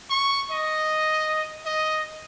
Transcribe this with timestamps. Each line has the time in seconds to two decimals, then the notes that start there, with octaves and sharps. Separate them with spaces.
0.10 C#6
0.51 D#5
1.66 D#5